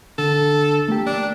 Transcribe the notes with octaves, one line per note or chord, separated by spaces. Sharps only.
D3 A4
A3 A#3 G4
D4